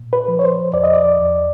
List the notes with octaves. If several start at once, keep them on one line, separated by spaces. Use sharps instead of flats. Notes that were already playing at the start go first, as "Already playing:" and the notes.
Already playing: A#2
B4
F3
C#5
C5
E2 D5
D#5
D5
E2